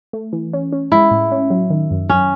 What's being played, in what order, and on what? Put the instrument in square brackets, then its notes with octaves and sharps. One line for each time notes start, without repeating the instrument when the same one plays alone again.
[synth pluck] A3
E3
C#4
C#4
[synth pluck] G#3 [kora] E4
[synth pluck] A2
C#4
F#3
D#3
F#2
[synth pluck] F#2 [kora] C#4